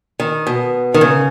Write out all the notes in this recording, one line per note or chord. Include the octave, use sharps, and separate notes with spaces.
D#3
B2
D#3
C#3